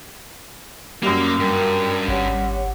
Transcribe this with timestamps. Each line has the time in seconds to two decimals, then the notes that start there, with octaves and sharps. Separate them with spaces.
1.03 F#2 G3 A#3
1.40 G2 A#4 G5
2.08 G#1 G4 C#5 F#5